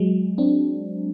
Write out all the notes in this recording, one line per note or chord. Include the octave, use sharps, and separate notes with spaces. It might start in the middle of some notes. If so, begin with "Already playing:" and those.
Already playing: F#3 G#3
C4 D4